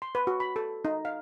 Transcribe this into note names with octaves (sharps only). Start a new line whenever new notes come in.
C6
B4
F#4
B5
A4
D#4
F5